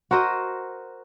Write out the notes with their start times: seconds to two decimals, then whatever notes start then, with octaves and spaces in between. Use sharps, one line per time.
0.11 F#4 A#4 C5 D#5